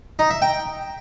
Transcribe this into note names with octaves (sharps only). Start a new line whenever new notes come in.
D#4
E5
G5